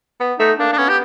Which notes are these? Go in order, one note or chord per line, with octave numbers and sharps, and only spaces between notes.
B3
A3 D#4
A#3 D4
D4
B3 C#4
G4